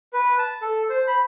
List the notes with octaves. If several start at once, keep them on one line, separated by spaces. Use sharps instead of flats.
B4
A5
A4
C5
B5